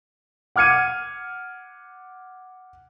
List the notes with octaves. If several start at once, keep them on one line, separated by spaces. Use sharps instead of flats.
F#5 D6 F6 G#6 C#7 D#7